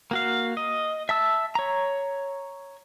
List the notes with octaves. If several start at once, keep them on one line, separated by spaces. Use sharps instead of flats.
A#3 F#4 F5
D#5
E5 A5 E6
C#5 A#5